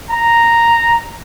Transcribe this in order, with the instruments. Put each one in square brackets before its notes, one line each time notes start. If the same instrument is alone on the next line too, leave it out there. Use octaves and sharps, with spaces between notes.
[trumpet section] A#5